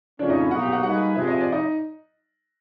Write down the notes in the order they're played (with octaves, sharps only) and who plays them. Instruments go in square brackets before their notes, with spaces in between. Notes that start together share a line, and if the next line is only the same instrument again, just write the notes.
[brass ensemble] F2 C#3 F3 A3 C#4 [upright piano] D4 D5
[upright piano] D#4 D#5
E4 E5
[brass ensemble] B2 F#3 A#3 D#4 [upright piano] F#4 F#5
[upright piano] G4 G5
F#4 F#5
[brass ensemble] G3 A#3 D#4 G#4 B4 [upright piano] F#4 F#5
[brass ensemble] C3 F3 G#3 [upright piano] E5
[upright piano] D#5
D5
D#4 D#5